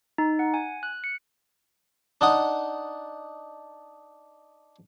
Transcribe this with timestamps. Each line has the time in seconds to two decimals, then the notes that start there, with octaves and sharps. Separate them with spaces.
0.18 D#4
0.39 F#5
0.54 G#5
0.83 F#6
1.04 C#7
2.21 D4 D#4 F#5 D#6